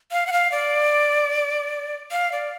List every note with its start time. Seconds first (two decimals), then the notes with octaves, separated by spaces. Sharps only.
0.12 F5
0.27 F#5
0.32 F5
0.52 D5
2.11 F5
2.32 D5